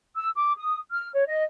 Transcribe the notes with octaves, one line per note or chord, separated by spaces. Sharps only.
E6
D6
D#6
F6
C#5
D#5